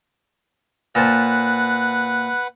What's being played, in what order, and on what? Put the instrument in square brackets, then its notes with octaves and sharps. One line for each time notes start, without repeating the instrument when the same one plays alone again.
[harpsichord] A#2 C5 A5 [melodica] B4 F#5